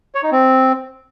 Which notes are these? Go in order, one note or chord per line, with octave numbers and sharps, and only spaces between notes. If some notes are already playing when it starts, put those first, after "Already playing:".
C#5
D#4
C4